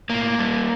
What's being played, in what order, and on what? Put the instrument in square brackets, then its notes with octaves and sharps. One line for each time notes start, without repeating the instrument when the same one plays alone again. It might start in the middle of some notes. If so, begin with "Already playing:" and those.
[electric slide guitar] A2 A#3
G3